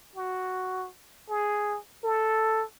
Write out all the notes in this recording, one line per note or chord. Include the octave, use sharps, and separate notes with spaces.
F#4
G#4
A4